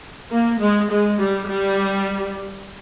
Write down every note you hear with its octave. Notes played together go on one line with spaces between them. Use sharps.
A#3
G#3
G#3
G3
G3